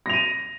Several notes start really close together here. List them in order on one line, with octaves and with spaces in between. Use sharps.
A#6 F7 D#7